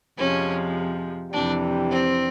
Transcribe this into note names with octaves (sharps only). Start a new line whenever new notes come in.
F2 C3 F3 G#3 C#4
F2 C3 E3 G3 D4
C4